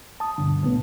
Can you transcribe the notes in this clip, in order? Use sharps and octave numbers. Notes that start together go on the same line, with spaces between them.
A5 D#6
D2 G2 B2 D3
A2 C#3 B3